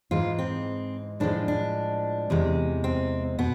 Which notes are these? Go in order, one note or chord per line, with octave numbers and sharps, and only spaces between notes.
G#2 E3 G#3 F4
C4
A2 F3 G#3 D4
D4
E2 C3 G#3
C4
B2 B3